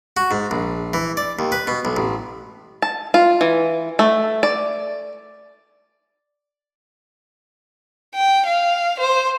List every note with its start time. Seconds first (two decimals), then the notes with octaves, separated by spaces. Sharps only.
0.17 F#4
0.31 G#2
0.51 A#1
0.94 E3
1.17 D5
1.39 D#2
1.52 B4
1.67 B2
1.85 B1
1.97 A1
2.82 A5
3.14 F4
3.41 E3
3.99 A3
4.43 D5
8.15 G5
8.46 F5
9.00 C5